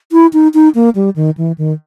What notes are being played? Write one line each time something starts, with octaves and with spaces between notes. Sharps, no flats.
E4
D#4
D#4
A#3
G3
D#3
E3
D#3